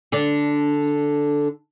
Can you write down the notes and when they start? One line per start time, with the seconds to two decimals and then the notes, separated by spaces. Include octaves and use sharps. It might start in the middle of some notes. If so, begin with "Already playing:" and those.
0.12 D3 D4